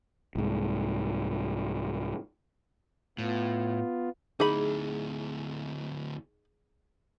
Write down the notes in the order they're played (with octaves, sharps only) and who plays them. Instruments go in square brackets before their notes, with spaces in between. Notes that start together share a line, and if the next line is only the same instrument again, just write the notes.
[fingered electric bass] C2 G#2
[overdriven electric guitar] A2 [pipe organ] B3 F4
[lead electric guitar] D2 E4 [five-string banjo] D#4 B5 [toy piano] G#4